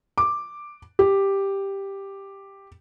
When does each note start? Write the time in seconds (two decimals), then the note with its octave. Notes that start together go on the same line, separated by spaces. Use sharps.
0.18 D6
0.99 G4